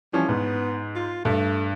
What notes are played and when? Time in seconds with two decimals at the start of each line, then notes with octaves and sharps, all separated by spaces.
0.13 E3 F3 G3 C#4
0.29 G#2 B3
0.96 F4
1.25 G2 A3